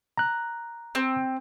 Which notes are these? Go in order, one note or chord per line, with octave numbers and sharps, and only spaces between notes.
A#5 F#6
C4